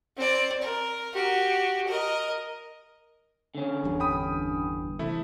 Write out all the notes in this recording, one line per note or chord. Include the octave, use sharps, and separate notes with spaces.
C4 D5
A#4
F#4 G4
A#4 D#5
D3 C#4
G1 E2 G2
G5 B5 D#6
C3 E3 A3 E4